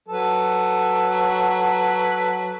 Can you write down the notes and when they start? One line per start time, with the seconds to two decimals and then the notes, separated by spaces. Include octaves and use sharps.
0.08 F#3 A4 B4